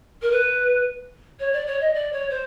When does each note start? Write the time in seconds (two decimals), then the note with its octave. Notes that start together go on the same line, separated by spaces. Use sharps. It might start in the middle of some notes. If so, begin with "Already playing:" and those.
0.21 A#4
0.30 B4
1.39 C#5
1.52 D5
1.66 C#5
1.80 D#5
1.93 D5
2.12 C#5
2.29 C5